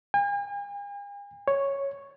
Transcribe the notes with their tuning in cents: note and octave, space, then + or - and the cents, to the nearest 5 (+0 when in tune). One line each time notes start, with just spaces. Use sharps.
G#5 -45
C#5 +0